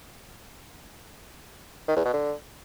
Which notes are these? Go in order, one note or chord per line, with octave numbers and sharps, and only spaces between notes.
D#3
E2
B2
D3